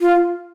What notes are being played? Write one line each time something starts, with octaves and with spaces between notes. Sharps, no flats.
F4